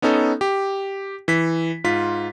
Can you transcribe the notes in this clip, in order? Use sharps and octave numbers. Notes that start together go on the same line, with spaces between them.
B3 C#4 D#4 A4
G4
E3 B6
G#2 F4 B6